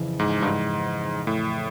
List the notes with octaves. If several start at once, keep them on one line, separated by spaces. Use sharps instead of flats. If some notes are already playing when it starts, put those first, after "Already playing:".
Already playing: F2 C#3 E3
G#2
G2
G#2
A2